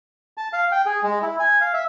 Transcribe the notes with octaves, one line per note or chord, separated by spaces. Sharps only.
A5
F5
G5
G#4
G#3
E4
G#5
F5
E5